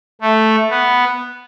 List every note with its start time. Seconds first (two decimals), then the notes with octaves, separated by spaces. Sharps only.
0.21 A3
0.70 B3